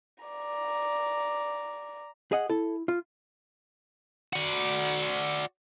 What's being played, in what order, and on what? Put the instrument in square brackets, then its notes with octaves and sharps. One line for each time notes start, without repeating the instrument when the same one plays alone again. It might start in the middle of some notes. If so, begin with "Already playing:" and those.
[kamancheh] D5 A#5
[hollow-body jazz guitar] G#4 D#5 F#5
[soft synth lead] E4 [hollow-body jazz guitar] A4
[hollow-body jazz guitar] F4
[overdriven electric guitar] F#4 D5